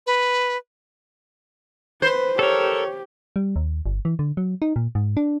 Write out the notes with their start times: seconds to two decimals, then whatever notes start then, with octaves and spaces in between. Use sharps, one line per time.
0.06 B4
2.02 B4 C5
2.39 G4 A4 A#4 C#5
3.36 G3
3.56 D#2
3.86 G1
4.05 E3
4.19 D3
4.37 F#3
4.62 D#4
4.76 A#2
4.95 G#2
5.17 D4